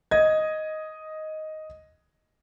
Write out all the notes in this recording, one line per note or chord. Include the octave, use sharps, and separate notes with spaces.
D#5 G#6